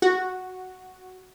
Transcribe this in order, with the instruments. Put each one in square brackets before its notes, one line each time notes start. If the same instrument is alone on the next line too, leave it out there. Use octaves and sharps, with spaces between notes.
[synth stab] F#4